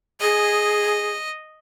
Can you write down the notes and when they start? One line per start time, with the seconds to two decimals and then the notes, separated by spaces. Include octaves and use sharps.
0.21 G#4 D#5